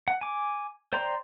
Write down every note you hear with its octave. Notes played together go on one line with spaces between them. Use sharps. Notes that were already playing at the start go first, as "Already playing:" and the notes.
F#5
G#5 D6
C5 D5 G5 A#5 C6